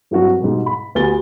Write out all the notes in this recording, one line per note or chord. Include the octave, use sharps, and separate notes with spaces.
G2 F#3 A#3 C4 D4 F#4
G#2 B2 G3
B5
D2 B3 G4 G#5 A6 G7